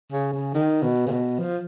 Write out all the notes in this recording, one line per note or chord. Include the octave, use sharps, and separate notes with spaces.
C#3
C#3
D#3
B2
C#3
B2
F3